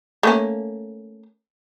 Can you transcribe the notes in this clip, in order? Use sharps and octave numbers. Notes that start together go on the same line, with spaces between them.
A3 A#3 C#4